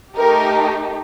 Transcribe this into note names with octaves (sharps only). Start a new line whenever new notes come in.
A3 D#4 G4 A#4